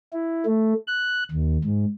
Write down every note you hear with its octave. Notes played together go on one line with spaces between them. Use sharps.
E4
A3
F#6
D#2
G#2